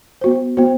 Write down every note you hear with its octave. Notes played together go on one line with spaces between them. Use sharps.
B3 F#4 C5
B3 F#4 C5